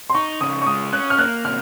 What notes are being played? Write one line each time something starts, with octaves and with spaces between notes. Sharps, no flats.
C6
D#4 C#6
C#3 D#6
C#6
G#3 D#6
C#4 F#6
F6
A#3 F#6
C3 F6